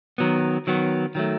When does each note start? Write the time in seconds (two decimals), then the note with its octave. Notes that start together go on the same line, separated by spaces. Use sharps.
0.18 D#3 F#3 B3
0.67 D#3 F#3 B3
1.15 D#3 F#3 A3